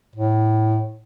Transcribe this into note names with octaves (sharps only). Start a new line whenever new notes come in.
A2